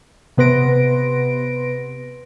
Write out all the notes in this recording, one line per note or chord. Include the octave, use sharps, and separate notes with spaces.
C3 B3 B4 C6 A#6 D7